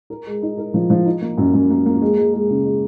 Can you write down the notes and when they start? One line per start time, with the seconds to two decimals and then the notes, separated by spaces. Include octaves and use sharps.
0.10 A#4
0.27 G#3
0.42 D#4
0.58 A#4
0.74 F3
0.90 F3
1.06 D#4
1.22 A#3
1.38 F#2
1.54 F#2
1.70 A#3
1.86 A#3
2.02 G#3
2.17 G#3
2.34 G#3
2.49 C#3
2.65 G#3